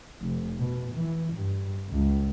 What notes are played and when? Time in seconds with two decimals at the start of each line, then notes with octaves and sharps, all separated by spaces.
0.21 F1
0.58 B2
0.94 E3
1.33 G2
1.91 C#2